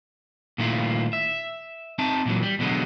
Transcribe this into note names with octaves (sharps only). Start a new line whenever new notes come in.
A#2 D#3 A3 E4 F4
E5
C4 D#4 E5 A5
A#2 E3 F#3
G3
E2 B2 D3 F#3 G#3 B3